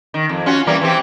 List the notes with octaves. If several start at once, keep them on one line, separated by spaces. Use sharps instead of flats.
D#3
F2
C#4 F4 F#4
E3 G3 A#3
E3 C4 G4